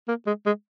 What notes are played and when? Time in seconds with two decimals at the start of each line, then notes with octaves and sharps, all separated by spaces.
0.08 A#3
0.27 G#3
0.46 G#3